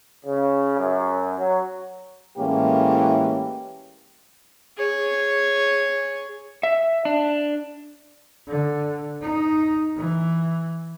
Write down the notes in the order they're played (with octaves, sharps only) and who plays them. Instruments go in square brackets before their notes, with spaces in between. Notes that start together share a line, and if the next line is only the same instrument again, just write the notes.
[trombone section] C#3
F#2
F#3
[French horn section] A2 E3 G#3 A#3 C#4 G4
[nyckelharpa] G#4 C#5
[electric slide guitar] E5
D4
[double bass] D3
D#4
E3